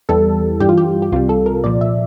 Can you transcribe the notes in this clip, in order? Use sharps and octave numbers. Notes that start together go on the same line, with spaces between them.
E2 E3 G3 A4
G2 E3 G3 G4
F4
G4
G4
C2 C3 G3 F4
A4
A#4
C2 A#2 F3 D5
E5